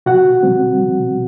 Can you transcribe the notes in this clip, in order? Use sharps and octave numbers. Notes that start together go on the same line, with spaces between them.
B2 F#4 F#5
G3 C4
B2